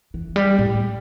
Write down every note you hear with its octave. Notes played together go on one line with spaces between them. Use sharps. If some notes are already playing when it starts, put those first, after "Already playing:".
E3
G3
A2